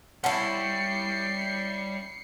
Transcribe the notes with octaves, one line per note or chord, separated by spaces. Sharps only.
G3 C#4 E4 F#5 A5 C6 C7 C#7